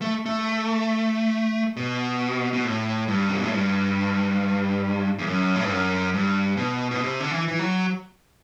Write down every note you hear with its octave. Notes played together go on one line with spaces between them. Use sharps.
A3
A3
B2
B2
A2
G2
C3
B2
A2
G2
E2
F#2
A2
G2
F#2
G2
B2
B2
C3
D3
E3
E3
F#3